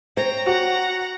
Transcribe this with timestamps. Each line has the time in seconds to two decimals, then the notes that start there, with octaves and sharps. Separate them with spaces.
0.17 C5 C#5 G5 A#5
0.46 F#4 F#5 A#5